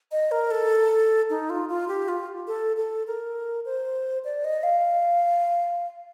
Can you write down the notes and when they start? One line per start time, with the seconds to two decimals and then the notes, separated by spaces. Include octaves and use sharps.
0.12 D#5
0.31 A#4
0.51 A4
1.30 D#4
1.50 F4
1.69 F4
1.88 G4
2.08 F4
2.47 A4
2.77 A4
3.07 A#4
3.65 C5
4.25 D5
4.45 D#5
4.63 F5